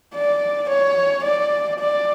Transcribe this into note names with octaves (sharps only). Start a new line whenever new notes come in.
D5
C#5
D5
D5